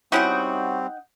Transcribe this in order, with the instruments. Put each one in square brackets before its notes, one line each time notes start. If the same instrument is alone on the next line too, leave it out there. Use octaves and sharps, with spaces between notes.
[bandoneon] G3 C4 [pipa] C#4 E4 F#4 [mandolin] D#4 F#5 G5